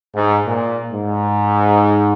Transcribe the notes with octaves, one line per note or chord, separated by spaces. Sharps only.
G#2
A#2
G#2